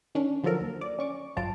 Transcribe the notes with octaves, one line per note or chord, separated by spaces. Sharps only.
D#3 C#4 D4
D3 F3 F#3 A4 A#4
D#2
D5
C#4 C#6 D6
G#1 G2 F#3 F4 A5 D7